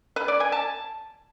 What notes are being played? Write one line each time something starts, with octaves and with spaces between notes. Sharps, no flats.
B4
D5
G#5
A5